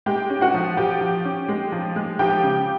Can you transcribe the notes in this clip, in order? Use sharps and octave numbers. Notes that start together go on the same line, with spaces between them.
G#3 G4 G5
C#4
F#4 F#5
F3
F3 G4 G5
F3
C#4
G#3
F3
G#3
F3 G4 G5
C#3